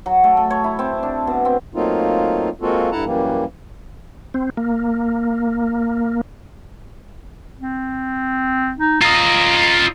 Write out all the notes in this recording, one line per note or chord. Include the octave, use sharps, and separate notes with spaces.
F#3
A3
A4
C#5
E4
C4
D4
B2
C4
F#3 A3 A#3 C4 D#4 F4
G#3 A#3 C4 F4 F#4 A4
G2 E4 A4 F#5 A5 A#5
F#2 E3 G3 A#3
C4
A#3
C4
D#4
F4 D#5 A#5